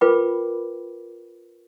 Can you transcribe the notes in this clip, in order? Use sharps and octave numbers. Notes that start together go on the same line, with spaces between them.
F4 A#4 B4 G5 B5 D6